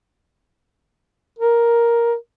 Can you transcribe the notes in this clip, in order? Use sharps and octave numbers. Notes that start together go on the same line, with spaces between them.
A#4